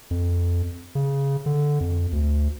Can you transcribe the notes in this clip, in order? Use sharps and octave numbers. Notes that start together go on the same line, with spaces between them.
F2
C#3
D3
F2
D2